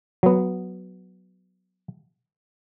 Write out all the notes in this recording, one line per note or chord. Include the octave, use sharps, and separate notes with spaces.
F#3 B3